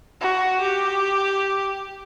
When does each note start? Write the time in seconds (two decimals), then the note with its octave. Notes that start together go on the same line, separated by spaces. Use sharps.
0.21 F#4
0.61 G4